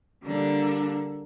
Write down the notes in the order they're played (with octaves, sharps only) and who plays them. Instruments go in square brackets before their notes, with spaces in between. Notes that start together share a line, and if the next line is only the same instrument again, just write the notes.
[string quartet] D3 G3 A#3 D4